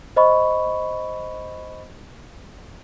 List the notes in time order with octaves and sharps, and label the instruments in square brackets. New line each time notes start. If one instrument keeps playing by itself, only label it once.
[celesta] C5 D#5 B5 C#6